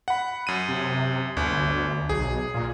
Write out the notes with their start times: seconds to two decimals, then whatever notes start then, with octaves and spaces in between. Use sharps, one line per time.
0.08 F#5 B5
0.47 F#2 D#7
0.69 C3
1.37 G1 D2
2.09 B1 G#4
2.54 A#2